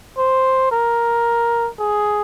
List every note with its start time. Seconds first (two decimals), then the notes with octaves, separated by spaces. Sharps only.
0.18 C5
0.72 A#4
1.80 G#4